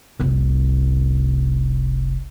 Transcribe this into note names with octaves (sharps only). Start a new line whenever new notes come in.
F1 C2